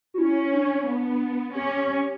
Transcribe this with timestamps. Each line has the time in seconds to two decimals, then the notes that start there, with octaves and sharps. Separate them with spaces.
0.14 F#4
0.18 C#4 E4
0.53 D4
0.87 B3
1.55 C#4 G4